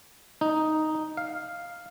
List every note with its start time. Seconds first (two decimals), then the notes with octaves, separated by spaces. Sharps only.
0.41 D#4
1.17 F5